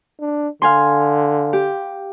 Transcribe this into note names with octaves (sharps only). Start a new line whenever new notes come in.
D4
D3 F5 G#5 C6
G4